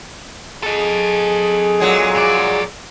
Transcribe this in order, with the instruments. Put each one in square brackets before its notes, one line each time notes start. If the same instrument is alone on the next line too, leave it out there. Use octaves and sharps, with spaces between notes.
[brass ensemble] G#4 [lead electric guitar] A4 D#5
[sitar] A#2 F#3 G#3
[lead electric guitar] F2 D5